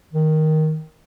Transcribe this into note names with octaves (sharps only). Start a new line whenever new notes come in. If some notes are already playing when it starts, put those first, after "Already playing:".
D#3